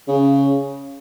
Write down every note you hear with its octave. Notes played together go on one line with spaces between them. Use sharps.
C#3